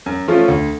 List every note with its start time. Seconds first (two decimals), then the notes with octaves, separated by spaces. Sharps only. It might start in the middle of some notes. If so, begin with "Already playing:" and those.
0.06 F#2
0.28 F3 A3 C#4 F4
0.48 D2